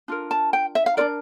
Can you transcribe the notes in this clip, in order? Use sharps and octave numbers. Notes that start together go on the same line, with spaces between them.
D4 F4 A#4
A5
G5
E5
F5
D4 F4 A#4 D5